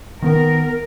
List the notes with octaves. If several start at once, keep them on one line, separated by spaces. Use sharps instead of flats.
D#3 B3 A#4